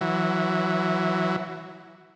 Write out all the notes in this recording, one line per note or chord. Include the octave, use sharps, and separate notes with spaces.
E3 F#3